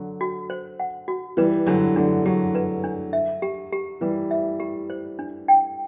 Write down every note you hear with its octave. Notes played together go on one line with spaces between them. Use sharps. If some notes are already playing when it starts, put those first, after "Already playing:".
Already playing: D3 F#3
F#4
C5
F#5
F#4
E3 G3 B4
D3 F#3 D4
D3 F#3 D4
D3 F#3 G4
B4
D4
E5
G4
G4
E3 G3 B4
E5
G4
C5
D4
G5